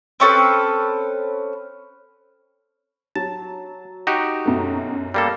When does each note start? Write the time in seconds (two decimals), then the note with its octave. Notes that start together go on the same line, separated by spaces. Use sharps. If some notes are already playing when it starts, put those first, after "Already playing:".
0.20 C4 C#4 A4 B4
3.16 F#3 A5
4.07 D#4 F#4 G4
4.45 F#2 B2 A3
5.14 G3 A#3 A4